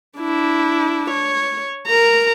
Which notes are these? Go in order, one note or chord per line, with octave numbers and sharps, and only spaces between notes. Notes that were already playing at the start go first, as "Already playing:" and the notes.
D4 E4
C#5
A#4 A#5